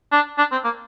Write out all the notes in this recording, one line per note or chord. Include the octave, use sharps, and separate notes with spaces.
D4
D4
C4
A#3